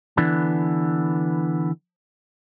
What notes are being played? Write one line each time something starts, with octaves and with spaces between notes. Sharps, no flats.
D3 E3 B3 D4